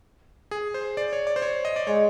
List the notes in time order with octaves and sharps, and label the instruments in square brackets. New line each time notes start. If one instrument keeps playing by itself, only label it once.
[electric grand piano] G#4
C5
D5
C#5
D5
C5
C#5
D#5
D5
[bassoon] G#3 [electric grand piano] C#5